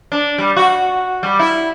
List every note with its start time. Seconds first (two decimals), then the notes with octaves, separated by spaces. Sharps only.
0.12 D4
0.38 G3
0.57 F#4
1.23 G3
1.39 E4